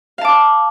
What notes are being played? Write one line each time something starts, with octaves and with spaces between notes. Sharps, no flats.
F5 A5 D6